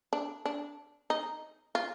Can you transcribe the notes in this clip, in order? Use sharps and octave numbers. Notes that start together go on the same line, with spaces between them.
D4
D4
D#4
F4